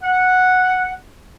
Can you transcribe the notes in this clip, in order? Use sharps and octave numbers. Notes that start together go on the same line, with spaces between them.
F#5